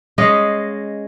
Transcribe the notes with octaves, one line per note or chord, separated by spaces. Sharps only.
G#3 C#4 D#5 F5